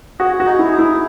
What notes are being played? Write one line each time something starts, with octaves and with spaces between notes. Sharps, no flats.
F#4 G#4
F#4
D#4
E4
G#4
E4